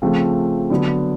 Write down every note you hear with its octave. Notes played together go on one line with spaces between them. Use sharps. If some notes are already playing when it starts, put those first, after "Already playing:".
C#3 F3 A3 C4 F4
D3 F#3 B3